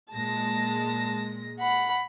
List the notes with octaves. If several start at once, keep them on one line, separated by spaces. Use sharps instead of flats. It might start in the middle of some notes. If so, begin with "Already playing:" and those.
A#2 G#3 A5 A#6
F#5 B5